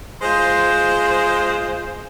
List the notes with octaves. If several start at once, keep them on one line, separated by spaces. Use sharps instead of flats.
G#3 F4 C5